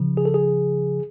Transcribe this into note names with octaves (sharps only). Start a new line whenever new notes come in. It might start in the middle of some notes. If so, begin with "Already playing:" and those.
Already playing: C#3 F3
G#4
A4
G#4